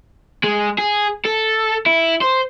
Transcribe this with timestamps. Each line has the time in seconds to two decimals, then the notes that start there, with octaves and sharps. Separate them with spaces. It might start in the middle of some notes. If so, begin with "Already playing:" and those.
0.44 G#3
0.78 G#4
1.25 A4
1.86 E4
2.21 C5